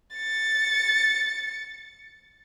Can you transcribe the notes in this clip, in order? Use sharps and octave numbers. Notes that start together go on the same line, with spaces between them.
A6 C#7